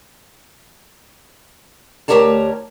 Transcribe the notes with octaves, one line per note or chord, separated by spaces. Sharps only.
D2 D#3 G4 A#4 C#5 A5